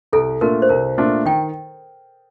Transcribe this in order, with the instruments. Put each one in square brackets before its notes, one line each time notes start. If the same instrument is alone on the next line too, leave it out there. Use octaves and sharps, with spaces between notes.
[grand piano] C2 [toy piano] A4
[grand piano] A#2 A3 D4 F4 [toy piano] A#4
[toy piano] C5
[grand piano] C2 [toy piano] A#4
[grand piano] A#2 A3 D4 F4
[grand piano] D#3 [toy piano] G5